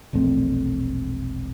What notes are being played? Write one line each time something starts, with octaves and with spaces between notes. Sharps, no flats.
E1 A#1 A3 C4